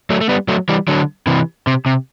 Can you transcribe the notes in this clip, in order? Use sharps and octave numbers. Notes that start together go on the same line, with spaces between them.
F#3 A3
A3
G3 B3
F#3 A3
E3 G3
D3 F#3
C3 E3
C3
C3